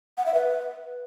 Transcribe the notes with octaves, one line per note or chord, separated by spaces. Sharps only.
F#5
E5
B4